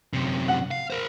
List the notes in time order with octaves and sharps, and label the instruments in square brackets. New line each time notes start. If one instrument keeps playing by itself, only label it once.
[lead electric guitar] F#2 C3
[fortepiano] F#5
[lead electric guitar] F5
A#4 C5